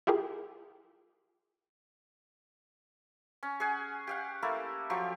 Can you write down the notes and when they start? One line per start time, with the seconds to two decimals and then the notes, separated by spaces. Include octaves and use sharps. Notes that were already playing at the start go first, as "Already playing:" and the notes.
0.07 E4 F4 G4 G#4 A#4
3.43 C#4
3.60 G#4 C#5 F#5 G#5
4.07 G4 F5 F#5
4.42 A3 A#3 E4 A4
4.90 F3 F#3 G4 C#6